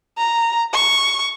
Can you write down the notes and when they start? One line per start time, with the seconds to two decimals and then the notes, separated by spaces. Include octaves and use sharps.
0.18 A#5
0.73 C#6